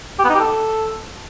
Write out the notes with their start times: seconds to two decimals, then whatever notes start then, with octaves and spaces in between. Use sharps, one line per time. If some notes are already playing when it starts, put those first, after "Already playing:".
0.19 G4
0.24 B3
0.29 D#4
0.34 G4
0.40 A4